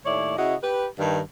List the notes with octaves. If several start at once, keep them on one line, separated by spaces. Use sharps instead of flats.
D#2 A2 E4 C#5 D5
C#3 E4 F#4 D#5
G4 B4
G2 D#3